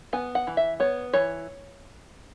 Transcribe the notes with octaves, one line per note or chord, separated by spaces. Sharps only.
B3 G#5
F#5
E3
E5
B3 C#5
E3 C#5